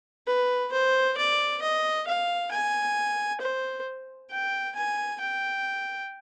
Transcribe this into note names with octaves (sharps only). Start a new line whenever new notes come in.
B4
C5
D5
D#5
F5
G#5
C5
G5
G#5
G5